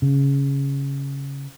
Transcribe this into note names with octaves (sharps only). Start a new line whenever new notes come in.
C#3